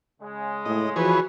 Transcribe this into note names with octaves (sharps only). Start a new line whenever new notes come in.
C#3 G#3
A2 D#5
E3 F3 F#4 G#4 B4 C#5